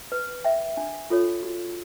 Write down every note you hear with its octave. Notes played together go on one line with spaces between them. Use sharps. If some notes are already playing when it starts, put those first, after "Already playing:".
B4
E5 G5
D4
F4 A4 C#5
F#4